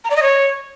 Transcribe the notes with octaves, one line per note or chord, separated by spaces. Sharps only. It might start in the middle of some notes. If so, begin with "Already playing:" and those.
A#5
D5
D#5
C#5